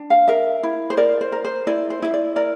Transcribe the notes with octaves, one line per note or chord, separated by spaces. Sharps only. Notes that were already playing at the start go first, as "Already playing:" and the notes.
Already playing: D4
F5
A#4 E5
E4
C5
A#4 D5
C5
A#4
C5
E4 D5
C5
E4 E5
D5
A#4 D5